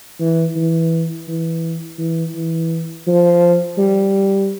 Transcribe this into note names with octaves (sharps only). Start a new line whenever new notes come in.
E3
E3
E3
E3
E3
F3
G3